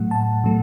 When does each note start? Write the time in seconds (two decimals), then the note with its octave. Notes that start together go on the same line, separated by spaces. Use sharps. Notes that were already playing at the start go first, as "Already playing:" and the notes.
Already playing: A2 F#3 A3 F#5
0.11 A5
0.44 A2 F#3 A3